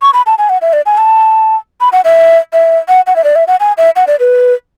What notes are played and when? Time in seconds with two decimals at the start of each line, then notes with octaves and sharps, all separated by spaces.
0.02 C#6
0.13 B5
0.26 A5
0.38 G#5
0.49 F#5
0.62 E5
0.73 D5
0.86 G#5
0.98 A5
1.81 B5
1.93 F#5
2.04 E5
2.53 E5
2.88 F#5
3.07 F#5
3.16 E5
3.24 D5
3.36 E5
3.48 F#5
3.60 G#5
3.78 E5
3.96 F#5
4.07 D5
4.20 B4